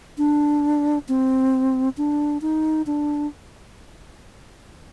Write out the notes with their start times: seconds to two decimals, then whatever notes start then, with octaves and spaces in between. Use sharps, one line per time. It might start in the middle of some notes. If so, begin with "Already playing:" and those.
0.18 D4
1.09 C4
1.97 D4
2.42 D#4
2.86 D4